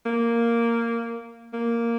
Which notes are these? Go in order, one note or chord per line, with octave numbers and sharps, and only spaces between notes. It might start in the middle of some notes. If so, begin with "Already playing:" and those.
A#3
A#3